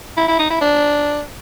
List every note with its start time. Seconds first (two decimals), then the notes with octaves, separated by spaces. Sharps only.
0.17 E4
0.28 E4
0.39 D#4
0.50 E4
0.61 D4